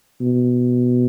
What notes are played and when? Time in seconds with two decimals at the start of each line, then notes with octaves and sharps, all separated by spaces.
0.21 B2